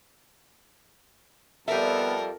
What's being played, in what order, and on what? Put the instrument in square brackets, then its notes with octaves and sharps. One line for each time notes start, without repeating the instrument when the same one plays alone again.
[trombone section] F2 A4 [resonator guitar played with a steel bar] G3 E5 [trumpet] B3 [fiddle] A#4